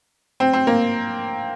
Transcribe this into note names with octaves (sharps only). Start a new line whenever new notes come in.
C4
C4
A#3